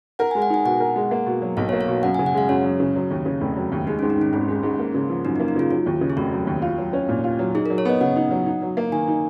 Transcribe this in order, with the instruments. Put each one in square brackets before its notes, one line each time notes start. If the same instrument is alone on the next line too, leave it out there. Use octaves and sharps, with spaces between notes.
[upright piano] A#4 [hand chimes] F#5
[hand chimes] G#5
[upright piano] G#3
[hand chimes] F#5
[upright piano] D#4 [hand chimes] G#5
[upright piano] B2 [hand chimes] F#5
[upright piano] A#4
G#3
A#3
B2
F#3
[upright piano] B1 [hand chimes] F5
[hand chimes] C#5
[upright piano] A#3
[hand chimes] F5
[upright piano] B2
[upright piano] F#2 [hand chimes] F#5
[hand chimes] G#5
[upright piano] C#3
[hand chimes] F#5
[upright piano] G#3 [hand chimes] F5
[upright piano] F#2 [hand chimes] C#5
[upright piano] F#2
C#3
F#3
D#2
C#3
F1
F#3
D#2
[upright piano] G#3 [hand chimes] D#4
[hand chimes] C#4
[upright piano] G#2
[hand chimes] D#4
[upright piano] D#3 [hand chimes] C#4
[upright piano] G#1 [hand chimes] C#4
[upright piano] G#3
G#2
A#3
C#3
F3
[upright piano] F#2 [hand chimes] D#4
[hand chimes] D#4
[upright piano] A#3
[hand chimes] D#4
[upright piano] C#3 [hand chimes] F4
[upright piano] F#3 [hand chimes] F4
[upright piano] D#2
C#3
[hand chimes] G#4
[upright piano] F1 [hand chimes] F#4
[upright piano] F#3
D#2
F4
F#3
C#4
A#2
F4
F#3
[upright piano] D#4 [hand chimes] G#4
[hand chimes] A#4
[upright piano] F#3
[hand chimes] C#5
[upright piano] B3 [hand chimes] D#5
[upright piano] C#3 [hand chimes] F#5
[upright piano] D#4
F#3
D#4
F#3
A#3
[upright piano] D#3 [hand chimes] G#5
[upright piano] D#4